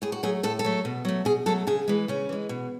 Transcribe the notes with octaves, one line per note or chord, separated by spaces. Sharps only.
A2 G#4
F#4
F#3 A3 G#4
A2 A4
A4
F#3 A3
B2
F#3 A3
B2 G#4
F#3 A3 A4
C#3 G#4
E3 G#3
C#3 C#4
E3 G#3
B2